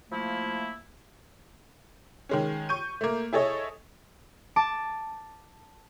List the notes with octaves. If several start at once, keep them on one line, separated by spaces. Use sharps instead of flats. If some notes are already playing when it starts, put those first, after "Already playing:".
F3 A3 A#3 E4
D#3 G#3 C#4
C#6 G6 D#7
A3 A#3
E4 G#4 A4 C#5 D#5
A5 D6